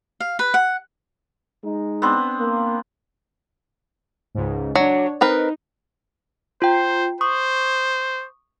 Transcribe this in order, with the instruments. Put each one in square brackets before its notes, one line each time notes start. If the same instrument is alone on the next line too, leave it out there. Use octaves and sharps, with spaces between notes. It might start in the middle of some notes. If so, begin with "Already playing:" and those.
[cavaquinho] F5
B4
F#5
[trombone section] G#3 D#4
[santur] B3 C4 D4
[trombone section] A#3
[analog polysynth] C#2 G#2
[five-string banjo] F#3 [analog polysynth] D4 C#5
[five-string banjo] C4 A#4 B4 [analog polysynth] D#4
[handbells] F4 G5 [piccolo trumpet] C5
[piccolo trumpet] C5 [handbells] C#6 D#6